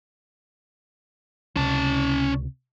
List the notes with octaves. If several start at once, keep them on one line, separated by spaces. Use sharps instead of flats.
C#2 C3 C#4 A5